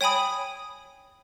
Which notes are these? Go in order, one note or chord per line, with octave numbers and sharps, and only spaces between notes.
C#5 G5 G#5 B5 D#6